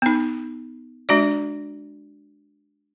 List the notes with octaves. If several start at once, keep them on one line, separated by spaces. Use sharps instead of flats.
B3 D#4
G#3 D4 F#4 D5